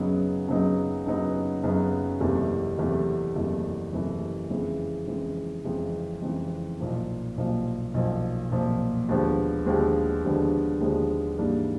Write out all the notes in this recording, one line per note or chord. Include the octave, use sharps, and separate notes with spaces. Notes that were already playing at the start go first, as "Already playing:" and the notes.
Already playing: F#2 C#3 F#3 B3 D#4
F#2 C#3 F#3 B3 D#4
F#2 C#3 F#3 B3 D#4
F#2 C#3 F#3 B3 D#4
F#1 E2 C3 E3 A3
F#1 E2 C3 E3 A3
F#1 E2 C3 E3 A3
F#1 E2 C3 E3 A3
F2 C#3 E3 G#3
F2 C#3 E3 G#3
F2 C#3 E3 G#3
F2 C#3 E3 G#3
B1 A#2 F3 A#3
B1 A#2 F3 A#3
B1 A#2 F3 A#3
B1 A#2 F3 A#3
D#2 D3 F3 G#3 B3
D#2 D3 F3 G#3 B3
D#2 D3 F3 G#3 B3
D#2 D3 F3 G#3 B3
G#2 E3 G3 A#3 D4